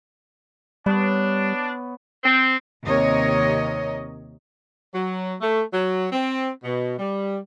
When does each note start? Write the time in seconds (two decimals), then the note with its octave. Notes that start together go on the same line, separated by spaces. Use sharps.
0.86 G3 B3 D4 C#5
2.24 C4
2.84 D#2 C3 A#4 C#5 D#5
4.93 F#3
5.41 A3
5.73 F#3
6.12 C4
6.63 B2
6.98 G3